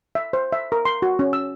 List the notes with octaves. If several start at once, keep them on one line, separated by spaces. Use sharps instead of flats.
E5
C5
E5
A#4
C6
F#4
C#4
E6